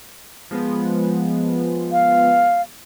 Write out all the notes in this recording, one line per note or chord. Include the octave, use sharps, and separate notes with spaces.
F3 G#3 B3
F5